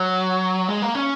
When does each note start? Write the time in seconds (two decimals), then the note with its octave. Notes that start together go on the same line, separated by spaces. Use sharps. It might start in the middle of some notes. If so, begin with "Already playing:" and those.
Already playing: F#3
0.68 G#3
0.82 A#3
0.95 C#4